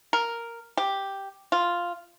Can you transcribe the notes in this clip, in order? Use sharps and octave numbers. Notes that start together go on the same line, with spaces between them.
A#4
G4
F4